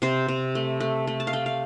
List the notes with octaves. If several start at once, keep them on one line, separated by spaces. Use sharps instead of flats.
C3 C5
C3
A3
A3
A3
A5
F5
A3 G5
F5